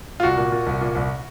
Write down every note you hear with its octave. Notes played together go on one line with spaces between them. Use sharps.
F4
C2 F#4
A#2
A#2
C2
A#2
C2